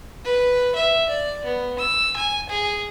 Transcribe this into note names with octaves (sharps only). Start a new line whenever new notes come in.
B4
E5
D5
B3
E6
G#5
G#4